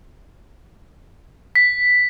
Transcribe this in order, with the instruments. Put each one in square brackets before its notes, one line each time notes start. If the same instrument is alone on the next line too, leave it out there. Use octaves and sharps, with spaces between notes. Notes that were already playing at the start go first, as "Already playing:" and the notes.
[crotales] B6